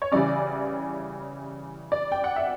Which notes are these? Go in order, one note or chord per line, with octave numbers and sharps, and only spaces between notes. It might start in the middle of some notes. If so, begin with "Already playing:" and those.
C#5
C#3 E3 G3 C#4 D5
D5
G5
F#5
E5